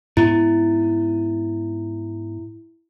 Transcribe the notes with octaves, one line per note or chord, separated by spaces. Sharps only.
G#2 B3 E4